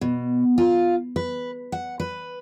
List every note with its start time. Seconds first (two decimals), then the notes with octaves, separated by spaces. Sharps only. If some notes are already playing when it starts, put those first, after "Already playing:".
0.01 B2
0.58 F4
1.16 B4
1.72 F#5
2.00 B4